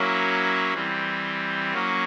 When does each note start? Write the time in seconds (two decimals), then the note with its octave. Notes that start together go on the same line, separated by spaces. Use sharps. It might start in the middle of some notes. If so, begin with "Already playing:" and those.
Already playing: F#3 A#3 C#4 E4
0.74 E3 G3 C4
1.73 F#3 A#3 C#4